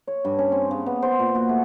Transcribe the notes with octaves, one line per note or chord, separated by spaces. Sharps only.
C#5
G2
C#4
C4
C#3
B3
C5
A#2
F#4
A3